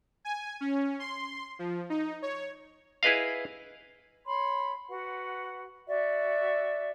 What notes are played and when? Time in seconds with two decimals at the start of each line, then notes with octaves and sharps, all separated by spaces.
0.25 G#5
0.61 C#4
1.00 C6
1.59 F3
1.90 D#4
2.22 C#5
3.03 E4 G#4 B4 D#5 F5
4.25 C#5 B5 C6
4.89 F#4 B4 F#5
5.88 F#4 D5 E5